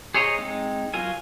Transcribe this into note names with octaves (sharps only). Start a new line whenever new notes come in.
G#4 C5 C#5 D#5 A#5
G#3 C4 D#4
F#3 F4 A#4 G#5